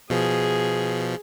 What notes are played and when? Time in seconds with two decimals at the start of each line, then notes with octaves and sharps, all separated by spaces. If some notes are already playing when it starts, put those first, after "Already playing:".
0.10 B2 F3 G#4